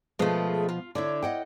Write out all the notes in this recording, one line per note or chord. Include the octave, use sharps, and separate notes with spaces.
B2 F3 G#3 A3 B3
F4
D3 D4 E4 C#5 D5
D#5 F#5 G5